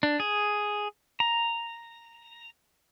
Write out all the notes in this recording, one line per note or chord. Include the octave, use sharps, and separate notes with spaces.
D4
G#4
A#5